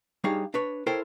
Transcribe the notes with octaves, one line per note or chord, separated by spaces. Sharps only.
G3 D4 D#4 G#4 C#5 F5
D4 B4 C#5
E4 A4 A#4 C5 C#5 G5